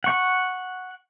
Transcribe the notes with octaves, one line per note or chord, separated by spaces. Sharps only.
F#5 C#6